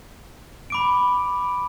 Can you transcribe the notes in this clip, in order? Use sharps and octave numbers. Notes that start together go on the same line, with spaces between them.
B5 D6 D7